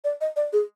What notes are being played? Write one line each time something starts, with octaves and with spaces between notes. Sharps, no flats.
D5
D#5
D5
G#4